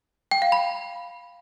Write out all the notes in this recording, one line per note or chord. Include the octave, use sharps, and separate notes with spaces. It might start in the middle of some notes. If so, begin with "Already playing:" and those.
G5
F5
B5